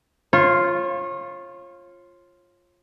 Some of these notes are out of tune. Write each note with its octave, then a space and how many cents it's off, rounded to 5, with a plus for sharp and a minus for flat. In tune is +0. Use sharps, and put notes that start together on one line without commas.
F4 +0 C#5 -35